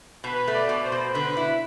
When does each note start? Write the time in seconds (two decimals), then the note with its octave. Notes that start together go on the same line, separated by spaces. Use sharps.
0.24 B2 B4
0.48 A3
0.55 D5
0.69 B2
0.84 C5
0.92 B2
1.15 D3 B4
1.37 E4